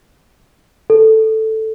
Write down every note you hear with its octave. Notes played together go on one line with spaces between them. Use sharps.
A4